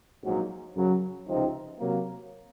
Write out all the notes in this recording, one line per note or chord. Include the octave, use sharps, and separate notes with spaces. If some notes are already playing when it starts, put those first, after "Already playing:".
A#1 G#2 F#3 A#3
F#2 C#3 F#3
C#2 C3 F3 C4 D#4
C3 F#3 A#3